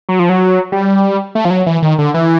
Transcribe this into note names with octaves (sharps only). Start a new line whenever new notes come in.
F#3
F3
F#3
G3
A3
F3
F#3
E3
D#3
D3
E3